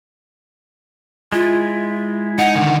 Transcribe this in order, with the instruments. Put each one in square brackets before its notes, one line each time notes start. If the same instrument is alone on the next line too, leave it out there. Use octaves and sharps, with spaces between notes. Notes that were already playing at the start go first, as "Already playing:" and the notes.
[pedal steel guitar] G#3 E4 [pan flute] F4
[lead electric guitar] D#4 [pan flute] F#5
[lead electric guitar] D3 D#3